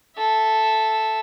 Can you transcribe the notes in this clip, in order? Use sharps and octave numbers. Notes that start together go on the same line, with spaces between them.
A4 E5